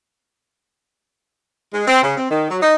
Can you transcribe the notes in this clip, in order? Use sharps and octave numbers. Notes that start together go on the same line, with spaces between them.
G#3
C4
C#3
C4
D#3
F#3
D#4